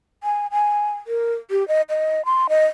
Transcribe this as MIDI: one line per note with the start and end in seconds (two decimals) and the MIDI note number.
0.24 0.47 80
0.51 0.93 80
1.07 1.34 70
1.51 1.67 67
1.68 1.82 75
1.90 2.25 75
2.25 2.47 84
2.49 2.65 75